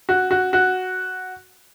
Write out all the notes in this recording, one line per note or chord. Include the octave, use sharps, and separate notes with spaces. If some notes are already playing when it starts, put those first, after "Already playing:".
F#4
F#4
F#4